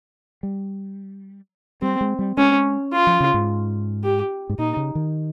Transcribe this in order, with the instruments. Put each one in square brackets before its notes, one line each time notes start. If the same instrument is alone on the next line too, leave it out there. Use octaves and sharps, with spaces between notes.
[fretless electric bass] G3
[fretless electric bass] G3 [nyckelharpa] C4
[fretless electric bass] G#3
G3
[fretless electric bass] G#3 [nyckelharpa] C#4
[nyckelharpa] F4
[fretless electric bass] F3
C#3
G#2
[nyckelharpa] G4
[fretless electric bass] G#2
[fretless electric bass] A#2 [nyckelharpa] D#4
[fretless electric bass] C#3
D#3